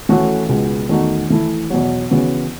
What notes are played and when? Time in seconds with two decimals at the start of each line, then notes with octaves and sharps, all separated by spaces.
0.09 E3 A3 C#4 F#4 A4
0.49 C#2 B2 G#3 B3
0.89 E2 D#3 A3 D#4 F#4
1.30 E3 A3 E4
1.70 E2 B2 F#3
2.11 C#3 E3 B3 F#4